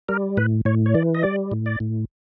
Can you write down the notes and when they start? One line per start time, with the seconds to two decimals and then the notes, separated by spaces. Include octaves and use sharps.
0.09 G3 A#4
0.37 A2 B4
0.65 A2 C#5
0.86 C#5
0.94 E3 D5
1.15 D#5
1.23 G3 D5
1.52 A2
1.66 D5
1.80 A2